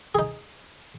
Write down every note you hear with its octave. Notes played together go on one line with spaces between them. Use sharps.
D#4 G#4